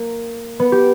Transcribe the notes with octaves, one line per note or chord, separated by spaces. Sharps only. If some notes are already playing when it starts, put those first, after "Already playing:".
Already playing: A#3
B3
G4